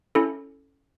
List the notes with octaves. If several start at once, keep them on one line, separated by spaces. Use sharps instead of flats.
C#4 E4 A4